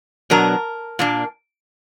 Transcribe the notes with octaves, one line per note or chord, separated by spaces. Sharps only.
B2 F#3 B3 D4 A#4
A#2 A#3 D4